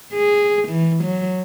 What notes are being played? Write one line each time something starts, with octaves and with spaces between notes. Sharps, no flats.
G#4
E3
F#3